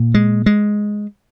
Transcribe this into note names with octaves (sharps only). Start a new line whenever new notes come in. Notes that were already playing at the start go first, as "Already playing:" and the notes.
Already playing: A#2
G#3
G#3